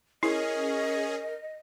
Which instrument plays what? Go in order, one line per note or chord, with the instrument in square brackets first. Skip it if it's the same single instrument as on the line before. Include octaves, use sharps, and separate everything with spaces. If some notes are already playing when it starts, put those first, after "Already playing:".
[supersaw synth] C#4 G#4 [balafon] E4 [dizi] A#4 [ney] D#5